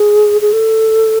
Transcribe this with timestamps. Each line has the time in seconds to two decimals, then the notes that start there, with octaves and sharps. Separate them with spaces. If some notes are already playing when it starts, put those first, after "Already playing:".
Already playing: G#4
0.41 G#4
0.53 A4